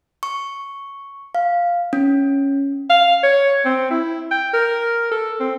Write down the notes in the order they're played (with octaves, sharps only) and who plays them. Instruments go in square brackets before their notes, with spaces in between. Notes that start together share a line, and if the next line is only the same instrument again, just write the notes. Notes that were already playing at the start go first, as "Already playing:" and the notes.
[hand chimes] C#6
F5
C#4
[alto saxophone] F5
C#5
C4
E4
G5
A#4
A4
C4